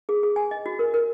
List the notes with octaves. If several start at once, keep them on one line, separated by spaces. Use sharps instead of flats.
G#4
G#4
G#5
D#5
F#4
A#4
A#4